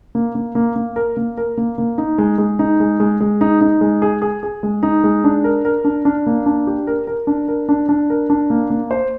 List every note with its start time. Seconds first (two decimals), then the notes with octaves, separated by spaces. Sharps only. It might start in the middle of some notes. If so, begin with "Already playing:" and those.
0.15 A#3
0.35 A#3
0.55 A#3
0.76 A#3
0.96 A#4
1.17 A#3
1.37 A#4
1.57 A#3
1.78 A#3
1.98 D#4
2.18 G#3
2.38 G#3
2.59 D#4
2.80 G#3
3.00 G#3
3.20 G#3
3.41 D#4
3.61 D#4
3.81 G#3
4.02 G#4
4.22 G#4
4.43 G#4
4.63 G#3
4.83 D#4
5.04 G#3
5.24 D4
5.44 A#4
5.65 A#4
5.85 D4
6.05 D4
6.26 A#3
6.46 D4
6.67 G4
6.87 A#4
7.07 A#4
7.27 D4
7.48 A#4
7.69 D4
7.89 D4
8.10 A#4
8.30 D4
8.50 A#3
8.70 A#3
8.91 C5